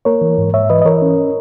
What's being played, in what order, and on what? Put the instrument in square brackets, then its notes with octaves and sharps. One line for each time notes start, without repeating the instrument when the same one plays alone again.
[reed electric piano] A#3 A#4 C#5
E3
G#2
G#2 C#5 E5
E3 B4 D#5
D#5
E3 A#4 C#5
C#4